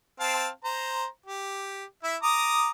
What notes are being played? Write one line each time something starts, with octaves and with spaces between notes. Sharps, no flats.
C4 F5 A5
C5 A#5
G4
E4 E5
A#5 D6 D#6